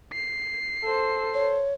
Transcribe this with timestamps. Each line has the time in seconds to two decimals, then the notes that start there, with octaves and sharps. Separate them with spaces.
0.13 C7
0.83 A4 C5
1.34 C#5